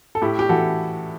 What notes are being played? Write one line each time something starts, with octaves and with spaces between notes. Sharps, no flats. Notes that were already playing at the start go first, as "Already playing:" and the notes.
A4
A2 E4 G4
G4
E3 F#4 A4